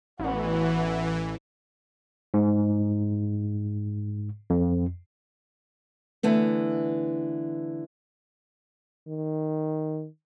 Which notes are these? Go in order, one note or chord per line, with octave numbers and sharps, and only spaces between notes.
A1 E3 B3 F#4
G#2
F2
D3 E3 A3 B3
D#3